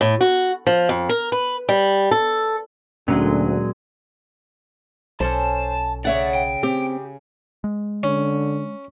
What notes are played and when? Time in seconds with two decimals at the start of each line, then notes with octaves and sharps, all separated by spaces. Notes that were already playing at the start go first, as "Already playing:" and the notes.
0.01 A2
0.21 F#4
0.67 F3
0.89 F2
1.09 A#4
1.32 B4
1.69 G3
2.11 A4
3.08 D2 A#2 F#3 G#3 C#4
5.20 B1 C#4 A4 C5 D5 A5
6.05 C#3 C#5 D5 E5 F#5 D6
6.35 G5
6.63 C4 G4
7.64 G#3
8.03 D3 C#4